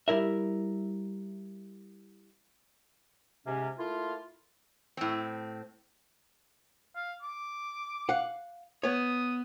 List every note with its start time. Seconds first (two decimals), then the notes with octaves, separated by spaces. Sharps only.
0.08 G3 E4 A#4 E5
3.47 G#2 C3 C#4
3.79 A3 A#3 E4 F4
4.97 A2 C4
6.96 F5
7.22 D6
8.09 F5 F#5
8.83 B3 C#5 D#6